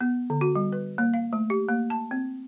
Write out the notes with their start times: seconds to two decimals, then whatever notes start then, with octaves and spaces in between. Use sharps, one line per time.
0.01 B3
0.30 D3
0.41 F#4
0.56 G3
0.72 B4
0.98 A#3
1.14 F5
1.33 A3
1.50 G4
1.69 A#3
1.90 A5
2.11 C4